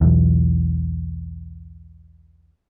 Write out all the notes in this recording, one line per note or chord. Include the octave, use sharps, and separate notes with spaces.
B1 E2